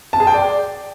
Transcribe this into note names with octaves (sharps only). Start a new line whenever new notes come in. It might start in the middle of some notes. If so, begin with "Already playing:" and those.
A5
G#4
G5
D5